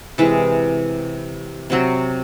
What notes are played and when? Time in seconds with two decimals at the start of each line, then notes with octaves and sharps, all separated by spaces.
0.18 C3 E3 G#3
1.70 C3 F#3 C4